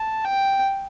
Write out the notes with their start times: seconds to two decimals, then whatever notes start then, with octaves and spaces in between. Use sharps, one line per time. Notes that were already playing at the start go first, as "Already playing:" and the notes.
Already playing: A5
0.25 G5